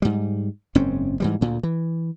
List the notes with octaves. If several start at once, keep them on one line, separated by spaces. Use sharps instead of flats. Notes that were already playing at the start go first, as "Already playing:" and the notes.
G#2 G3
F#1 G#2 C4 C#4
G#2 E3 G3
D2 A#2
E3